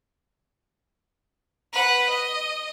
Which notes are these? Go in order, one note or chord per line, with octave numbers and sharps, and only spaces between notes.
B4 F#5
D#5